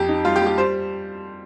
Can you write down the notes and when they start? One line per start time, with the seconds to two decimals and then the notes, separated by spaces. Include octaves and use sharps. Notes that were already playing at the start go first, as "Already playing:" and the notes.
Already playing: F2 G4
0.09 D#4
0.25 G3 F4
0.36 G4
0.41 G3
0.47 G4
0.58 G3 C5